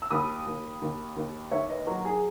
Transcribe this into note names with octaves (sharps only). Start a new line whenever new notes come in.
E6
D#2 B5 D#6
D#2
D#2
D#2
D#3 C#5 E5
B4 D#5
F#3 F#4 A#4
G#4